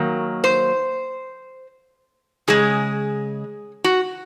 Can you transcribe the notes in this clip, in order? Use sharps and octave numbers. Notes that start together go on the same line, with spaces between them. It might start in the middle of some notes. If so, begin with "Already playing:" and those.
Already playing: D#3 F#3 A#3
C5
C#3 G#3 G#4
F#4